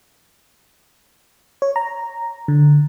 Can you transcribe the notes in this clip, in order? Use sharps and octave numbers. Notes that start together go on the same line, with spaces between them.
C#5
A#5
D3